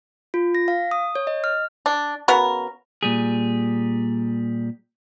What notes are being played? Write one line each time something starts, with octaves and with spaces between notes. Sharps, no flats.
F4
A#6
F5
D#6
C#5
D#5
F6
D4
C#3 B3 F#4 A#4
A#2 G3 G#4